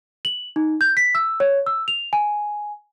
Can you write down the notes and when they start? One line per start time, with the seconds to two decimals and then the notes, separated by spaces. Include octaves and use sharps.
0.25 F#7
0.56 D#4
0.81 G6
0.97 B6
1.15 E6
1.40 C#5
1.66 E6
1.88 F7
2.13 G#5